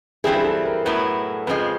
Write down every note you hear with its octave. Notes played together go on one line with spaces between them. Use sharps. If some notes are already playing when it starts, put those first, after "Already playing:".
G2 E3 G3 C4 E4 G#4
G#4
A4
A#4
A2 F#3 B3 E4 B4
F2 C#3 F3 G#3 B4